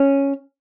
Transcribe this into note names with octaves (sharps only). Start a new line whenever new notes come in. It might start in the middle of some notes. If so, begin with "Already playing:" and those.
Already playing: C#4